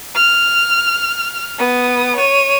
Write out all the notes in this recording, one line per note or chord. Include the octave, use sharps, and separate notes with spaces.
F6
B3 D#6
C#5 D#7